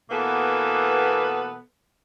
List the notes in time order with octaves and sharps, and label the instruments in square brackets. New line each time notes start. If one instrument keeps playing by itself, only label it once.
[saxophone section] B2 E3 A#3 B3 A4 B4